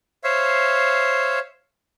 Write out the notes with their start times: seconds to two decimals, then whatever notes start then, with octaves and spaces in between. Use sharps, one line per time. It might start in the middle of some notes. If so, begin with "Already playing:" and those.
0.24 C5 C#5 E5 F5